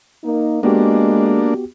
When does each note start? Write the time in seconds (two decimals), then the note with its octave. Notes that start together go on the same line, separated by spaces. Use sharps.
0.24 A#3 D#4
0.63 G#3 A#3 B3 D4 F#4 G4